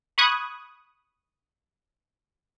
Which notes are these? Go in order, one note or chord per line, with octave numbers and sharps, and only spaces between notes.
B5 C#6 D#6 F#6 G#6